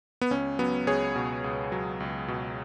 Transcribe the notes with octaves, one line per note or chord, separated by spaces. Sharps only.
B3
C#2 C#4
F#3 B3
C#2 G#4 C#5
B2
C#2
F#3
C#2
B2